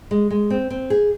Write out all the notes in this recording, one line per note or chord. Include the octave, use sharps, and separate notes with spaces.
G#3
G#3
C4
C4
G#4